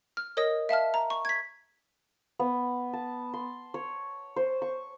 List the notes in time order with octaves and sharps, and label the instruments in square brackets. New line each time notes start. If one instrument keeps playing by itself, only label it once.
[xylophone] F6
A#4 C#5 D#5 D#6 A#6
E5 F5 A5 F6
A#5
C#6
G#6 B6
[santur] B3
A5
C6
C#5
C5
C#6